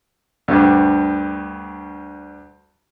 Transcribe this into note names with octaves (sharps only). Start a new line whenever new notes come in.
D2 G2